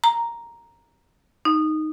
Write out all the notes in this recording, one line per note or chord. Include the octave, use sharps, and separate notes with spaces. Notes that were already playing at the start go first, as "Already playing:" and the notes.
A#5
D#4